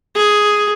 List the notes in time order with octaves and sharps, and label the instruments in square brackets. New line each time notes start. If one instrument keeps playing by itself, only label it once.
[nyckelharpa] G#4